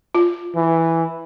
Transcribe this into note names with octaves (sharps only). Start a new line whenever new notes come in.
F4
E3